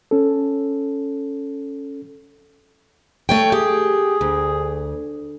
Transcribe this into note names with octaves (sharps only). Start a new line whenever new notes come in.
C#4 A4
A3 C#5 G5
G4 G#4
D2